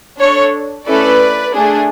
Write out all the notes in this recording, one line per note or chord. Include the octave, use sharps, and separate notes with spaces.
D4 A4 C#5
A3 C#4 E4 A4 B4 D5
A3 D4 G#4